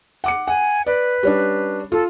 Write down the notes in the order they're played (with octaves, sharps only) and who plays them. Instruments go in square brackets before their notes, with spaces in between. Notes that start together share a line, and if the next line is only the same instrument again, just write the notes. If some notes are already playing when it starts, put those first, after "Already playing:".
[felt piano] F#5 D6 C#7
[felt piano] F#5 [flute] G#5
[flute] B4 [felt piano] D5
[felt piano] G3 C#4 D4
[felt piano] F4 [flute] A4